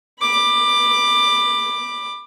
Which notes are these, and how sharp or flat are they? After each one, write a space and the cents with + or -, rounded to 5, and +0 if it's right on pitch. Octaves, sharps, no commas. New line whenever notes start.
B5 -5 D6 +20